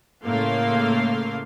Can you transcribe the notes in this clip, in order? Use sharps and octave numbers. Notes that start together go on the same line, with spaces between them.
A2 C#3 A3 A#3 F5 C6